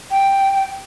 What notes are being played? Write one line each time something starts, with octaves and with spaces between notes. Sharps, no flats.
G5